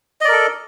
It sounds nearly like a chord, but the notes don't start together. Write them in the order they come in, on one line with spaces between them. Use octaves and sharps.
D#5 D5 A#4 A4